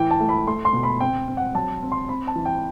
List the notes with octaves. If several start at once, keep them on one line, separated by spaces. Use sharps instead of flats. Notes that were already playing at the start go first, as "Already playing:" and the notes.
Already playing: A2 E3 G5
A5
A3
B5
A3 C6
C6
B2
B5
C4 G5
C4
F#5
F#3 A5
C4
C6
C4 B5
A5
E3
G5